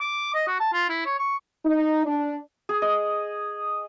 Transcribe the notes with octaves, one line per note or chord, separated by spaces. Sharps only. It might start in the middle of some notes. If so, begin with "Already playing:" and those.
D6
D#5
F#4
A5
F4
E4
C#5
C#6
D#4
D4
G#4
D#5